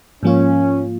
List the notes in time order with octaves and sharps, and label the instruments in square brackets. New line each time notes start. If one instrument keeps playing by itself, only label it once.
[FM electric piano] G#2 F3 A#3 F4 [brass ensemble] C#4